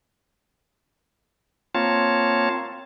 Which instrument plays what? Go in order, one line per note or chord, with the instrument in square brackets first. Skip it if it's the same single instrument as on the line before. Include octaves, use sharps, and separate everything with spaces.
[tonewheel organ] A#3 C4 F4 C#5 A5